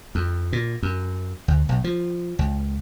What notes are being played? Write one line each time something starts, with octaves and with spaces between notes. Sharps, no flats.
F2
A#2
F#2
D2
B1
F3
C#2